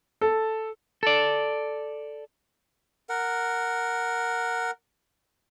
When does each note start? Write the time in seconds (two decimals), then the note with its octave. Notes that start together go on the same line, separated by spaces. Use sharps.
0.21 A4
1.03 A4 D5
3.09 A#4 F#5